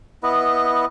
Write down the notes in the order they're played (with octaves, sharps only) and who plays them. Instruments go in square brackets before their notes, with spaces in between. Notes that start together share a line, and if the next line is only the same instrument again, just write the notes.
[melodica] B3 E4 B4 D#5